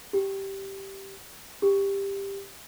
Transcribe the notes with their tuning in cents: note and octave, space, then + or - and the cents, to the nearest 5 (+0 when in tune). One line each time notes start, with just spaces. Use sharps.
G4 -10
G4 +10